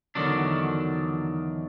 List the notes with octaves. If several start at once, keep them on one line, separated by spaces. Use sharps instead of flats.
E2 D3 D#3 F#3 D4